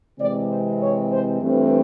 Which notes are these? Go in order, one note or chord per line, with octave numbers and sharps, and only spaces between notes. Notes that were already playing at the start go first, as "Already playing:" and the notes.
C3 E3 G#3 C4 D5
C5
C#5
C5
G2 E3 A3 C4